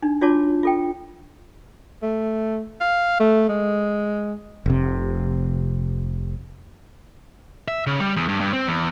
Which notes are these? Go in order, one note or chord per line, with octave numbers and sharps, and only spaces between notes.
D4 D#4
D4 F4 F#4 C#5 A5 D6
F4 A4 G5
A3
F5
A3
G#3
F1 C3
E5
C#3
G3
E2
G2
G2
C4
E2